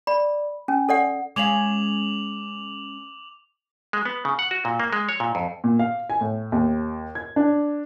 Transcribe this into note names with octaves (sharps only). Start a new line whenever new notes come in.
D5 B5
C#4 G#5
A4 D5 F#5
G#3 C#4 F5 D6 F7 F#7
G#3
B3
C#3
F#5
F#4
A#2
A#3
G#3
C#5
A#2
F2
A#2
F5
G#5
A2
D#2
G#6
D4